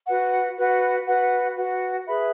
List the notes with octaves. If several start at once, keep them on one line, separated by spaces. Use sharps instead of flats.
F#4 B4 F#5
F#4 B4 F#5
F#4 B4 F#5
F#4 B4 F#5
G#4 B4 E5 B5